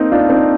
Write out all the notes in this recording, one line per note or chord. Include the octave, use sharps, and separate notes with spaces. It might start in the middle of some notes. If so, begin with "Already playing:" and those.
Already playing: A#3 C4 D#4
D4 F4
C4 D#4